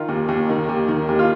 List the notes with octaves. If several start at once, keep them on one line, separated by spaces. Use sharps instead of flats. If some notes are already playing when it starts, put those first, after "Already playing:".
Already playing: D#3 F4
D#2
D#2
D#3
D#2
D#3
D#2
F4